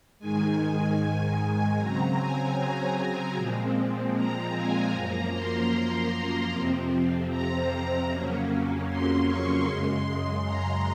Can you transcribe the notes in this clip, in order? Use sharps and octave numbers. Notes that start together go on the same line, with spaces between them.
G#2 D#3 G#3 G#5
C#3 F#3 C4 A#5
G#5
G#5
A#2 F3 G#3 C4
A#5
G#5
F#2 F3 A#3 A#5
C6
F2 C3 F3 C4
A#5
F2 C#3 F#3 A#3 C#4
C6
C#6
F#2 C#3 G#3 C6
A#5